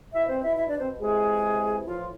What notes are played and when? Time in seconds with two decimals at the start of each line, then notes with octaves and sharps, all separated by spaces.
0.14 B2 E4 E5
0.28 C4 C5
0.43 E4 E5
0.57 E4 E5
0.68 D4 D5
0.78 C4 C5
1.00 C3 E3 G#3 G#4
1.86 A2 E3 F3 F4